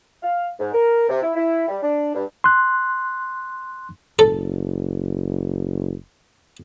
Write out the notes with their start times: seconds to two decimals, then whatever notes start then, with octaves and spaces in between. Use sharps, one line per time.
0.22 F5
0.59 G#2
0.73 A#4
1.09 C3
1.22 E4
1.35 E4
1.68 G3
1.82 D4
2.15 G2
2.44 C6 F#6
4.19 F#1 A4